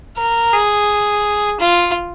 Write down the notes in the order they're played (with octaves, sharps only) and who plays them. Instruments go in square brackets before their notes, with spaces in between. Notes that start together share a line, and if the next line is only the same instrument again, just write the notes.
[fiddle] A#4
G#4
F4